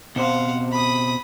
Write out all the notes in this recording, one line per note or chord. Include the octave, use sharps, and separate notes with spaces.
B2 C4 C5 F5 F#5
B5 D#6